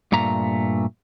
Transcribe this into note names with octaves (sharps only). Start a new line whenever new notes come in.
G2 A#2 A3 A#5